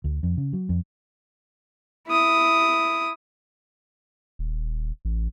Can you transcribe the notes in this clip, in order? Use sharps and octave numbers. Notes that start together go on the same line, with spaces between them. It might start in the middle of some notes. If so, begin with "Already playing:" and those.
D2
F2
C#3
F#3
F2
E4 D#6
D#1
A1